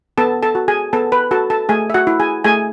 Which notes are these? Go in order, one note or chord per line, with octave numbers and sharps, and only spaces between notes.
B3 A4 A5
A4 A5
F#4
G#4 G#5
B3 A4 A5
B4 B5
F#4 A4 A5
A4 A5
A3 G#4 G#5
E5
F#4 F#5
E4
G#4 G#5
A3 G#4 G#5